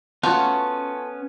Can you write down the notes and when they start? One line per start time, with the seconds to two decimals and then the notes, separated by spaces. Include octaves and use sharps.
0.23 A3 B3 C#4 F4 F#4